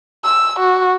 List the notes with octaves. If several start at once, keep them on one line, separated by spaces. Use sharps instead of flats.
E6
F#4